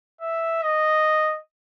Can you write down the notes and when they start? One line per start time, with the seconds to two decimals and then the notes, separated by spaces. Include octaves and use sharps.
0.21 E5
0.63 D#5